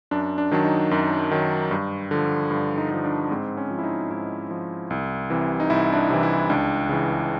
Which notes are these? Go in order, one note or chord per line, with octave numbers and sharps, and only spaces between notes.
F#2 D4
D4
D#3 F#3 D4
D#4
F#2
D#3 F#3
G2
D3 F3
G2
D#4
D3 F3
D4
G#2 C4
C#4
F3
E4
D#4
G#2 E4
F3
C2
C3 E3
D#4
C2 E4
D4
D#4
C3 E3
E4
C#2 D4
C#3 E3